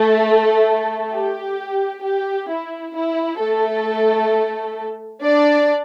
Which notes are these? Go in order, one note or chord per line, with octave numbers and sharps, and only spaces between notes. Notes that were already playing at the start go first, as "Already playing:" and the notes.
Already playing: A3 A4
G4
G4
E4
E4
A3 A4
D4 D5